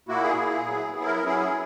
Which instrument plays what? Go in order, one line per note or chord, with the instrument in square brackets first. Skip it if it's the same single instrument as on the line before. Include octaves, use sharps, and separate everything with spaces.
[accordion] A#2 A#3 E4 F#4
G#4
A#2 A#3 E4
F#3 B3 E4
F#3 B3 E4 G#4
A#4
A#4
F#3 C#4 E4 G#4
G#4